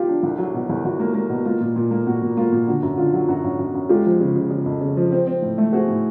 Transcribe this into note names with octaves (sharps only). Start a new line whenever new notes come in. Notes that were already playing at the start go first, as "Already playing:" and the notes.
Already playing: F#3 F4 G4
D4
C2
F#3
B2
C2
C2 F#4
A#3
A#3
B2
A#3 F4
A#2
A#2
A#3
A#2 F#4
A#2
A#3 F4
A#2
D3 F#4
F#2
D3 F4
F#3
F#2 F#4
F#2
F#2
F#2
G#3 F4 G4
F3
C#3
C#3
C#3
F2
C#3
F3
C4
C4
A2
A3
C4 F#4 G#4
A2